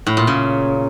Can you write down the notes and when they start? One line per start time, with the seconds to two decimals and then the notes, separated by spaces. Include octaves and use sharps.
0.07 A2
0.17 A#2
0.27 C#3